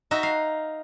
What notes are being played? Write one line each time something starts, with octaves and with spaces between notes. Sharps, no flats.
D#4 F#4 E5
F5